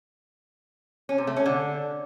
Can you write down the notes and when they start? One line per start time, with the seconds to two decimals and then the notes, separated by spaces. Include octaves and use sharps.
1.09 C#4
1.18 C3
1.27 A3
1.36 C#4
1.46 D3